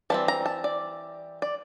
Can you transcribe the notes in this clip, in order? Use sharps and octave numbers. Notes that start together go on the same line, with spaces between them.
E3 G3 C4 A5
A#5
A5
D5
D5